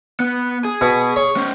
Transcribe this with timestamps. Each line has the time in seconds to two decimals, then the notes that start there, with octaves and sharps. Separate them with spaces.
0.20 B3
0.65 G#4
0.81 B2
1.16 C#5
1.37 C#4 C5